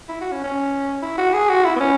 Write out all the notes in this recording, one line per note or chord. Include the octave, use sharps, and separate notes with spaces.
E4
F#4
C#4
C#4
E4
F#4
G#4
F#4
E4
B3
C#4